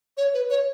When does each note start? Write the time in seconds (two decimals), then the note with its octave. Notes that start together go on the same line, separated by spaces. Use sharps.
0.17 C#5
0.34 B4
0.50 C#5